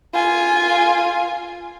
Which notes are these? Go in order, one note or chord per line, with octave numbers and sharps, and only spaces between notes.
F4 G#5